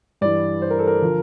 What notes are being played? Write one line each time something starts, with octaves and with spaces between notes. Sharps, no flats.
G2 E3 D5
C5
A#4
A4
A#4
D3 F3